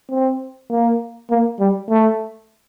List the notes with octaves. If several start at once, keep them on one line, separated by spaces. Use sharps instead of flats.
C4
A#3
A#3
G3
A3